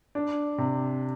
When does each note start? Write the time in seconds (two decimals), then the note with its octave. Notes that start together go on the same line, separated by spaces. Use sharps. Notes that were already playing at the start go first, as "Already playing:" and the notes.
0.15 D4
0.58 C3